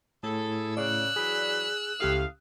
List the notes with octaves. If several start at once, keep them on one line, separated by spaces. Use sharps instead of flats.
A2 E4 G#4 A4
C#3 D5 E6 F#6
E3 F#3 G#4 B5
C#2 A2 G4 F5 D#6